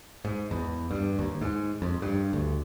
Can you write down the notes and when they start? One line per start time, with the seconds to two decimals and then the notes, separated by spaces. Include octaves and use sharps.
0.25 G#2
0.51 E2
0.91 G2
1.19 D#2
1.41 G#2
1.82 F2
2.02 G2
2.33 D2